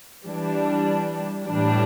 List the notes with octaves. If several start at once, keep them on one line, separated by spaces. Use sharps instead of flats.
E3 G3 D4
A2 E3 G3 D4